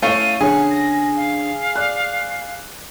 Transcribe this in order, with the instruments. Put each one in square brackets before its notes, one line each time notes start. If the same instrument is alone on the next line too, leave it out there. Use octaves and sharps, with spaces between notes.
[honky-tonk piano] A3 F5 C#6 [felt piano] C#4 E4 C#5 [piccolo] D#7
[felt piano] D3 C#4 [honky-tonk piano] G#4 [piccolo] F#5
[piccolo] A#6
F5
[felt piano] D5 F#6